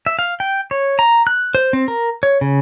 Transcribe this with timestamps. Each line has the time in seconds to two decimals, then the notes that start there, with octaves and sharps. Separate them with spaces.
0.06 E5
0.19 F5
0.40 G5
0.71 C#5
0.99 A#5
1.27 F#6
1.55 C5
1.73 C4
1.88 A#4
2.23 C#5
2.41 C#3